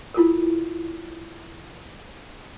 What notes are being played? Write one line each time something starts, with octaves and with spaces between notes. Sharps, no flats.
E4 F4 A4 A#4